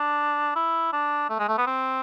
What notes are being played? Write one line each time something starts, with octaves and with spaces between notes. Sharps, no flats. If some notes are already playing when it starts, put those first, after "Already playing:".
Already playing: D4
E4
D4
A3
G#3
A3
B3
C4